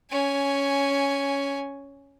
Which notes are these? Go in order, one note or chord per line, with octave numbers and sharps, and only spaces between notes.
C#4 G#5